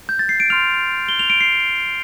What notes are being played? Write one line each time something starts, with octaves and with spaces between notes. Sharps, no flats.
G6
A6
C7
D7
C6 F6 F7
G7
F7
D7
C7